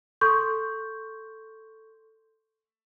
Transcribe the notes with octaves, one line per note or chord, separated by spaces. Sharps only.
A4 C6 C#6 G6